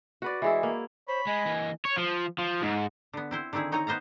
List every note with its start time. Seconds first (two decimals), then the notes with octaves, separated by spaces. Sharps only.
0.22 F#4 B4 D5
0.42 E3 G#3 E4
0.63 A#3
1.08 C5 C#5 B5
1.27 G#3 D#5 G#5
1.46 E3 A#3
1.85 C#5
1.97 F3
2.38 F3
2.63 G#2
3.13 D3 B3
3.31 C4 E4 C5
3.53 D3 D#3 C4 E4 G#4
3.72 C4 D#4 C#5 G#5 A#5
3.87 B3 C5 D#5 F5 A#5